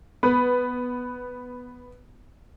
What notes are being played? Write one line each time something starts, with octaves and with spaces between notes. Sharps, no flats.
B3 B4